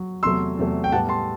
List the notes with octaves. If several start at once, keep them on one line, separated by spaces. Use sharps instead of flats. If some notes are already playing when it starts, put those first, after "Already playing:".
Already playing: F#3
E2 C3 F#3 A3 C6 E6
E2 C3 F#3 A3
G5
A2 G3 B3 F#5 A5
A5 C6